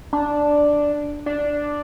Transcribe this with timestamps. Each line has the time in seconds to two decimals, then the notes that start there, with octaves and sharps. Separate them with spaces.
0.13 D4
1.26 D4